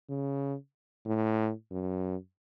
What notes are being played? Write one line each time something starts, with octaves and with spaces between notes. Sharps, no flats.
C#3
A2
F#2